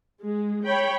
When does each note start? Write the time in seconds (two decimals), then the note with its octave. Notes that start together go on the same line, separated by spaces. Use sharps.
0.22 G#3
0.65 C#5 G5 B5